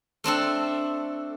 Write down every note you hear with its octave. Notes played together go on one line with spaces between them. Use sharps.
A3 C4 D4 A4